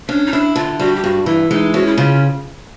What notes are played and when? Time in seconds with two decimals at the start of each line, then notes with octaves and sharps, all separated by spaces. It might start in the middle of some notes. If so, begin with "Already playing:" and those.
0.09 C#4 D4
0.27 D#4
0.32 D4 E4
0.56 D3 F4
0.80 G3 F#4
0.95 G4
1.04 G2 F#4
1.26 E3 E4
1.51 G#3 D#4
1.74 C#4 F#4
1.86 E4
1.98 C#3 F4